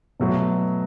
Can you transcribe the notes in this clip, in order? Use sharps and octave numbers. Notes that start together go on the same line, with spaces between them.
B2 F#3 A3